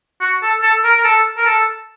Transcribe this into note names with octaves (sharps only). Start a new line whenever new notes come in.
F#4
A4
A4
A#4
A#4
A4
A#4
A4